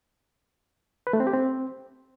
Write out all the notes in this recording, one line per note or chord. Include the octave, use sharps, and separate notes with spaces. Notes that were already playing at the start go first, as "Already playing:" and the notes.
B4
A3
C4
G4
C4